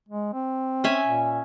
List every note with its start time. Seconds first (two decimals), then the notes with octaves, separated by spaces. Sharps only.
0.09 G#3
0.33 C4
0.84 C#4 E5 G#5
1.04 A#2